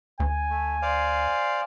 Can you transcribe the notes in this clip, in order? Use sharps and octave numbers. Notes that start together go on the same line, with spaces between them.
D2 G#5
A3
C5 D5 F5